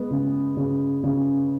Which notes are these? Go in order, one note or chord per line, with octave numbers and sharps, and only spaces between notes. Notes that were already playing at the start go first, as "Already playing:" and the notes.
Already playing: G#3 B3
C#3
C#3
C#3